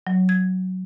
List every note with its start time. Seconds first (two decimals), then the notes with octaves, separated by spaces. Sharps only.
0.07 F#3
0.29 G#6